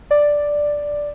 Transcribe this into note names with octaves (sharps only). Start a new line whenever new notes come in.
D5